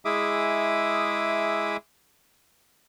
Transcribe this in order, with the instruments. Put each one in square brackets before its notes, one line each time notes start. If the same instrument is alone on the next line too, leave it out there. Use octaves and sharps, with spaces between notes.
[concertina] G#3 E4 G#4 E5 D6 D#6